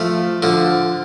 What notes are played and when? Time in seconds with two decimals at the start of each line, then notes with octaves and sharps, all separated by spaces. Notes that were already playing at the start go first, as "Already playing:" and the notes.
Already playing: F3 A3
0.42 D3 F3